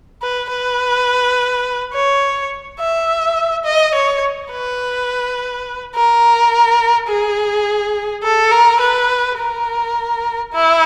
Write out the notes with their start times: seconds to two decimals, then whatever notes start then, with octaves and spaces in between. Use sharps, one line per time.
0.22 B4
0.50 B4
1.93 C#5
2.80 E5
3.65 D#5
3.95 C#5
4.52 B4
5.95 A#4
7.08 G#4
8.24 A4
8.52 A#4
8.81 B4
9.38 A#4
10.53 E4